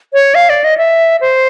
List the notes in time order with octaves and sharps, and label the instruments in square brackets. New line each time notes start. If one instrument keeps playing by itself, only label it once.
[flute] C#5
F5
D5
D#5
E5
C5